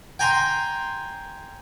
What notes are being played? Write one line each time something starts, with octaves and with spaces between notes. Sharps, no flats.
G5 G#5 A#5 C6